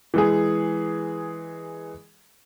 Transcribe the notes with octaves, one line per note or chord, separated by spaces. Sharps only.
E3 G#3 G#4